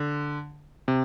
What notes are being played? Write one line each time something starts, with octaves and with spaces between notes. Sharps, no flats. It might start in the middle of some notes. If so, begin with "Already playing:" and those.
Already playing: D3
C3